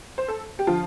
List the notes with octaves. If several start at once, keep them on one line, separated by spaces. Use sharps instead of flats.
C5
A4
G4
D3 F3 F4